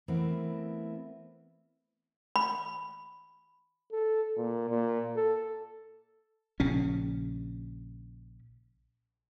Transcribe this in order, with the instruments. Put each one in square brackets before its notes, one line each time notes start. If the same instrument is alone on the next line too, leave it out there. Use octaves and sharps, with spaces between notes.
[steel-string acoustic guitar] E3 A3 B3 C4 E4 A#4
[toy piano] B5
[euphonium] A4
A#2
A#2
A4
[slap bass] A#1 C#3 C#4